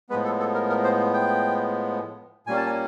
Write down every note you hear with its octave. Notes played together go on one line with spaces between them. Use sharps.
A2 F3 G#3 B3 B4
A4
A4
A#4
A#4
C5
G5
A#2 G3 A#3 C#4 G#5
A5
G#5